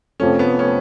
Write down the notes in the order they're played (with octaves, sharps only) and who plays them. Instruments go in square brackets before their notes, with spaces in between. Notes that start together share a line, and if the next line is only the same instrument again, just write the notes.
[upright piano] F1 F2 F3 A3 [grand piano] C#4
[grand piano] B3
C#4